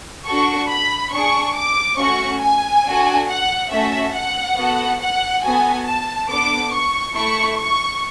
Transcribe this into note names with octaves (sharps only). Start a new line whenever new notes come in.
D4 F#4 A4 C#6
B5
D4 G#4 C#6
D6
A3 C#4 F#4 C#6
G#5
D4 F#4 A4
F#5
A3 C#4 F#4 A4 E5
F#5
B3 F#4 A4
F#5
B3 F#4 A4 G#5
A5
B3 D4 A4 D6
C#6
A3 E4 A4 C#6
C#6